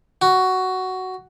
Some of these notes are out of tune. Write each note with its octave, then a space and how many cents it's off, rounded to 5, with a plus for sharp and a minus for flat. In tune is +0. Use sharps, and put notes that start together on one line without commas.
F#4 +10